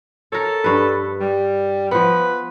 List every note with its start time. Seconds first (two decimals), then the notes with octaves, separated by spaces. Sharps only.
0.32 A4 A#4 C#5
0.64 G2 B4
1.20 G3
1.91 F3 B3 B4